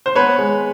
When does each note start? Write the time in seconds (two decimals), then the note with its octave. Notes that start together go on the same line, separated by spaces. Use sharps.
0.06 C5
0.16 B3 B4 C#5
0.38 G#3